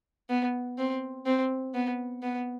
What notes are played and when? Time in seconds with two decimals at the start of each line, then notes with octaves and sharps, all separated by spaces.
0.29 B3
0.78 C4
1.26 C4
1.74 B3
2.23 B3